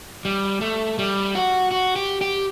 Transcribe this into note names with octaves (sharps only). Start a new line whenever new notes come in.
G3
A3
G3
F#4
F#4
G4
G4